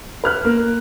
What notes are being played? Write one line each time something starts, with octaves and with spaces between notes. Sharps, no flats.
B4 F6 F#6
A#3